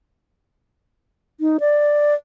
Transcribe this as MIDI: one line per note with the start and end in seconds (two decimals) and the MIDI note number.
1.40 1.57 63
1.60 2.14 74